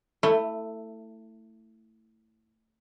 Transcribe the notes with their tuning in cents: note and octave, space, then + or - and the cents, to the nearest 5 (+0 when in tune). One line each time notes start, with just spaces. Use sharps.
A3 +20 E4 +0